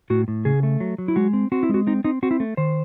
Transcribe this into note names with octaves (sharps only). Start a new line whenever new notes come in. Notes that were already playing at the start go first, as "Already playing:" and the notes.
A2 F#4
A2
C#3 G#4
A3
F#3
F#3
E4
G#3 F#4
C4
C4 F#4
E4
G#3 F#4
C4 D#4
C4 D#4
C4 F#4
E4
A3
D#3 C5